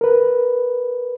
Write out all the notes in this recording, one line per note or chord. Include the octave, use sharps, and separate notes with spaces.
A#4 B4